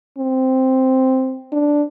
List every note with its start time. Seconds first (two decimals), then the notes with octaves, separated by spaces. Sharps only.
0.18 C4
1.52 D4